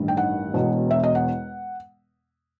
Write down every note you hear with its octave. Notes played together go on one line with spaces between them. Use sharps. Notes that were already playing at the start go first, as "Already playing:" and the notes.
Already playing: A1 G2 D#3
G5
F#5
E1 E2 B2
E5
D#5
F#5